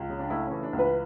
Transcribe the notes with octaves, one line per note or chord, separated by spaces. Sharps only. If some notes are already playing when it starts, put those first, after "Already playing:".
Already playing: C#2
C#3
D4
A3 E4
E3 C#4
D4
C#2
B4